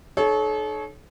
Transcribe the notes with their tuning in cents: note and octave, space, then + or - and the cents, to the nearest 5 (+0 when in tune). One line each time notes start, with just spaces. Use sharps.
D#4 -35 A4 -40 C#5 +0